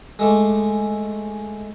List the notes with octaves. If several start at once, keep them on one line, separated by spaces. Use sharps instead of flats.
G#3 A3 D6